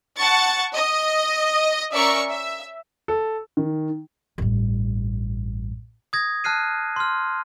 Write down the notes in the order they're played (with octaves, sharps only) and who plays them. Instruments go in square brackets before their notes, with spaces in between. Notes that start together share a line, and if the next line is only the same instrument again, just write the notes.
[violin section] F#5 A5 C#6 A6 C#7
D#5
C#4 A#4 D5 E5 C#6
E5
[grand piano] A4
D#3
[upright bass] A1 G2
[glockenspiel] D#6 G#6 A#6
A5 F6 F#6 C7 D#7
C6 F6